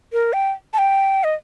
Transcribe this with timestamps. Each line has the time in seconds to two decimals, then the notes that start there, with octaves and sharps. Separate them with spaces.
0.13 A#4
0.33 G5
0.73 A5
0.78 G5
1.24 D#5